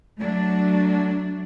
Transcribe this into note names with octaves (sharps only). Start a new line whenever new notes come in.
F#3 A3 D4